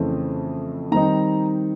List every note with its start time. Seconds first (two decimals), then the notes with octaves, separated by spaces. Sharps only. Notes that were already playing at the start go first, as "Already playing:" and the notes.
Already playing: F2 C#3 E3 A3 C4
0.92 D#3 G3 C4 D#4 A#5